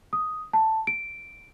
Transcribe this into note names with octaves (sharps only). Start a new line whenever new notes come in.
D#6
A5
D7